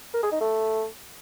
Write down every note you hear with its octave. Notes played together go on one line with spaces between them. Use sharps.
A#4
G#4
D#4
A3